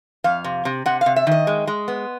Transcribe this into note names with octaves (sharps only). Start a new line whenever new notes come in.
F2 F5
C3
C3
C3 F#5
F5
C3
E5
D#3 D#5
G#3
G#3
B3